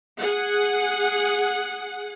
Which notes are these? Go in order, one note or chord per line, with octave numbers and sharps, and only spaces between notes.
G#4 F#5